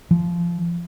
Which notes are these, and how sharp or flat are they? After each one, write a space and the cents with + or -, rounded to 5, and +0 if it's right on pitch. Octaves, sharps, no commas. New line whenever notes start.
F3 -20